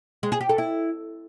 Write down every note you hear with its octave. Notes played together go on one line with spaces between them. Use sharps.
G#3
G#4
G4
A4
E4